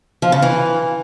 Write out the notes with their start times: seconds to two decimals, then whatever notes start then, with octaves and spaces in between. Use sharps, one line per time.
0.22 F3
0.32 C#3
0.42 E3